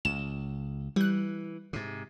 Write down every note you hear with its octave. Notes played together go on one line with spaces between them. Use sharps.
C#2 E7
E3 G3 F#6
G#2 C3